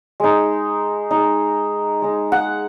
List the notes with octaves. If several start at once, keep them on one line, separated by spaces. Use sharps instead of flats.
G#3 D#4
G#3 D#4
G#3 D#4
F#5